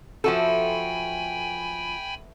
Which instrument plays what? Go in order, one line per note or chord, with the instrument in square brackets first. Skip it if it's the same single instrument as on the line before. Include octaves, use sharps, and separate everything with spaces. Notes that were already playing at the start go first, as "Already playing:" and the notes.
[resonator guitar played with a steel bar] F3 F#4 A4 [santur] A3 B3 [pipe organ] G5 G#5 B5